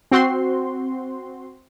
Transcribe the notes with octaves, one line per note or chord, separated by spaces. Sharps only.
C4 F#4 C6